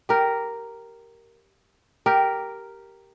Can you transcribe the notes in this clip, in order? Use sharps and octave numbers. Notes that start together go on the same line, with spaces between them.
G4 A#4
G4 A#4